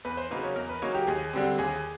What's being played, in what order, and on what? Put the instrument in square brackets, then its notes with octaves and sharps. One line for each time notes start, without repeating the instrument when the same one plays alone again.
[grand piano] E2 B4
C5
C#3 F#3 A#3 D#4 B4
C#5
E2 A#4
B4
C#3 F#3 A#3 D#4 C#5
G4
D#2 G#4
D3 G3 C4
D#2 G#4